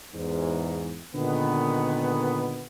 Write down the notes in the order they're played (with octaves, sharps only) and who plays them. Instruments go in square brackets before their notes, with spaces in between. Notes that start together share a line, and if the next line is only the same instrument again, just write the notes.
[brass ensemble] E2 G#2
A#2 D3 D#3 G#3 B3